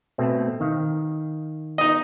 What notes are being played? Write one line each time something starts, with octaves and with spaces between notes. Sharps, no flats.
B2 A3 C4
D#3 F5
D#4 D#5